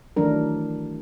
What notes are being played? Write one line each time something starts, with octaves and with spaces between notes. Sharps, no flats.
D#3 E3 F#3 A3 D4 A#4